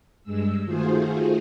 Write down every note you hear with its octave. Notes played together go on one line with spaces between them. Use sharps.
G2 G#3 E6
D#3 A3 F4 F#4 G#4 C5